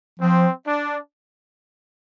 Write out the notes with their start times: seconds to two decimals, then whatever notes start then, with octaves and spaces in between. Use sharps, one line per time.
0.19 F3 C4
0.65 D4